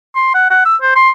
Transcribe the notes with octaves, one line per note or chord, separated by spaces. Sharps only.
C6
F#5
F#5
E6
C5
C6